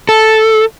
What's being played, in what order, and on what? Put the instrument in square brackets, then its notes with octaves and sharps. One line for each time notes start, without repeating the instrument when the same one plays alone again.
[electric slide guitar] A4